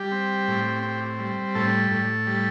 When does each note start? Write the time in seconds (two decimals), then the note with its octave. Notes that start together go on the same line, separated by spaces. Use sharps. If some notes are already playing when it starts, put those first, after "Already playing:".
Already playing: G3 G4
0.12 C4
0.48 A2
0.83 C4
1.19 G3
1.55 A2 A4
1.91 A2
2.27 G3